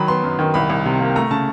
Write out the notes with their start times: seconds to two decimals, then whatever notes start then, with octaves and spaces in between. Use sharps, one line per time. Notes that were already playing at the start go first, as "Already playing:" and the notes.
Already playing: D#3 F#3 B5
0.08 B3 C6
0.24 F#2
0.39 D#3
0.54 C2 B5
0.70 C2
0.85 C3
1.00 A#3
1.16 A3 A#5
1.31 C#3 A5